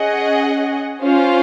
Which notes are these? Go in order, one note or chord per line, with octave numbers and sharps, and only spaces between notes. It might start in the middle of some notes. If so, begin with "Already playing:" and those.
Already playing: C#4 G#4 D#5 F#5
C#4 F4 C5 F5